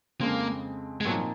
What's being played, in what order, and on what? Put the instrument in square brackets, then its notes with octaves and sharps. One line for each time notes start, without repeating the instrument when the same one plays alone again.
[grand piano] F2 C#3 G#3 C4 [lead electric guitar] A#3
[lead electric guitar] G#3
[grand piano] A#2 F3 C4 D#4 [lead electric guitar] F#3